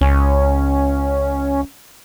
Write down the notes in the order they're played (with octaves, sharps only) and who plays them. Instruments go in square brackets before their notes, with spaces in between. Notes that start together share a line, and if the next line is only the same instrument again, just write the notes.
[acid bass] C#2 [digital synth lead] C#4